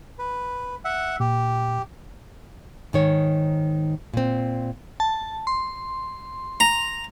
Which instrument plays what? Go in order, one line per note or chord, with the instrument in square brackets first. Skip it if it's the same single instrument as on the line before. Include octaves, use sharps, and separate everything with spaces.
[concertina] B4
E5 F#5
[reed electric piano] A#2 [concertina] G4
[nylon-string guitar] G#2 D#3 C#5
A#2 C4
[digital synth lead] A5
C6
[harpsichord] A#5